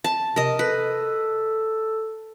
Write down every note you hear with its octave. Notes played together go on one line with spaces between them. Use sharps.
A5
C3 A#4 D#5
A4 B4